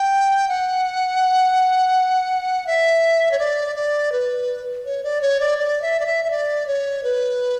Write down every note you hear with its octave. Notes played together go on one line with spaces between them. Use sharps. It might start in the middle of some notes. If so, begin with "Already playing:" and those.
Already playing: G5
F#5
E5
C#5
D5
D5
B4
C#5
D5
C#5
D5
D5
E5
D5
E5
E5
D5
C#5
B4